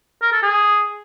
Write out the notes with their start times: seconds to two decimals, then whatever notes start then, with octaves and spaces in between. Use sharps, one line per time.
0.22 A#4
0.32 A4
0.43 G#4